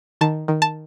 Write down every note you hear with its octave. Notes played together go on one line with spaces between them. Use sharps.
D#3 A5
D#3
A5